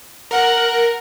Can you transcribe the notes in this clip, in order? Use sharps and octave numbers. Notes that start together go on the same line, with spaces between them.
A#4 F#5